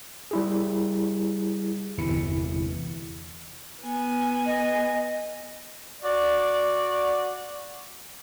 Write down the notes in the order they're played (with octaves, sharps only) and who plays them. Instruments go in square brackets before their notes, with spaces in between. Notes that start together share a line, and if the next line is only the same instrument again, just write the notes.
[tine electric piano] G3 E4 G#4
G1 E2 C3 E3 E4 C#7
[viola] B3 G#5
[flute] D#5
[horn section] F#4 D5